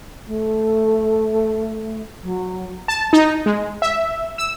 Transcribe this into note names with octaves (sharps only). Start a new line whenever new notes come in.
A3
F#3
A5
D#4
G#3
E5
E6